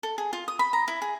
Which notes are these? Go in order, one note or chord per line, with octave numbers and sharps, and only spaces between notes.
A4
G#4
F4
D#6
B5
A#5
E4
G#4